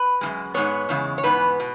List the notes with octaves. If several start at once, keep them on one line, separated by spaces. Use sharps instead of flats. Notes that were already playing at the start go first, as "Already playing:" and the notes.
Already playing: B4
F#2 C#3 G#3
G#2 G#3 B3 C#5
E2 C#3 G#3
C#5
G#2 E3 B3 B4
B2